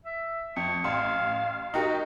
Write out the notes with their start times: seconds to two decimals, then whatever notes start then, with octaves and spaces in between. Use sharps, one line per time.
0.05 E5
0.56 F2 C#6
0.84 A1 F5 C6
1.74 D#4 F#4 G4 A#4